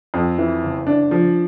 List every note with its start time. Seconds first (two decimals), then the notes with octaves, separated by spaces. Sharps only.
0.14 F2
0.38 E3
0.63 F#1
0.87 D4
1.11 F3